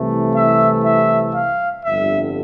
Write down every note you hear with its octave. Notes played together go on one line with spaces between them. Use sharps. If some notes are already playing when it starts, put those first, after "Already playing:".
Already playing: C2 C3 E3 A3
E5
E5
F5
G1 F2 D3 G3 E5